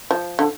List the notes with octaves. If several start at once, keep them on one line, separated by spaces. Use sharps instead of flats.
F3
D3